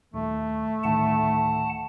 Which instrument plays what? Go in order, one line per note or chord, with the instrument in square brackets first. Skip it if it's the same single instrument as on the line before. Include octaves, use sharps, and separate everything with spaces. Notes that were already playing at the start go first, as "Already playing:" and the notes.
[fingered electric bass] D#1 [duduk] A3
[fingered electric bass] D2 A2 D#3 [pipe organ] F#5 A5